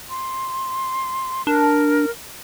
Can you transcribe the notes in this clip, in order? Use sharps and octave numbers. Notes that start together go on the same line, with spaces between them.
C6
D4 A#4